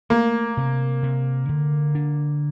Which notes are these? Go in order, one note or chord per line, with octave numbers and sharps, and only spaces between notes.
A3 A#3
C3
C3
D3
D4